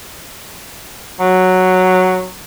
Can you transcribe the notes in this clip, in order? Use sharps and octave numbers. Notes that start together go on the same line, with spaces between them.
F#3